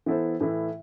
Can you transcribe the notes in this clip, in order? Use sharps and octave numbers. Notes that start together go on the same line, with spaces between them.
E3 B3 E4 A4 C5
A2 E3 A3 E4